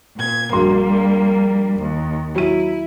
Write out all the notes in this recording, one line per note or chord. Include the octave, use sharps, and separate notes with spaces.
A#2 G#6
A#1 G3 A#3 F#4 C6
D#2
F#3 E4 D#7